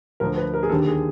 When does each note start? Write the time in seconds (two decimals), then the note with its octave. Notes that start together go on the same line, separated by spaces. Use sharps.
0.20 D2 D3 F3 A#4
0.37 B4
0.54 A#4
0.63 G#4
0.70 D#2 D3 G3 A4
0.87 G#4